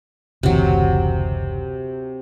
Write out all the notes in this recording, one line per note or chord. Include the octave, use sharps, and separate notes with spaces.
F#1 D2 C3 E3 F#3